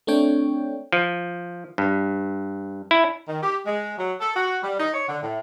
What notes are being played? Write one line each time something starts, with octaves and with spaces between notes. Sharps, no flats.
A3 C4 D4 C#5 G5
F3
G2
E4
D#3
G4
G#3
F#3
A4
F#4
G3
D#4
C#5
D3
A2